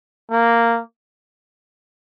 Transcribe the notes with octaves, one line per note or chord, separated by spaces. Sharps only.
A#3